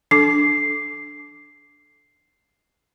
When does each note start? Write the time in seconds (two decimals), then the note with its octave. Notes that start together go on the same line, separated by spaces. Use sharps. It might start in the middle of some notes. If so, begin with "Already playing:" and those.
0.11 D4 A4 D6 C7